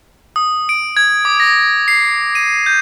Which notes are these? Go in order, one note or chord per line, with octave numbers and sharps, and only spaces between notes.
D#6
D7
G#6
D6
A#6
C7
D#7
G6